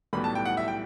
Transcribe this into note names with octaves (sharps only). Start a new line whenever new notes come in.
B1 A2 E3 G3 B3 B5
A5
G5
F#5
E5
G5